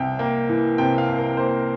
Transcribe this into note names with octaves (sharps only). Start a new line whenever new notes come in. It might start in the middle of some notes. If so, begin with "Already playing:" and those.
Already playing: C2 C3 G5
A#3 G5
E3
C3 G5
F5
C2
A#4
A#3 C5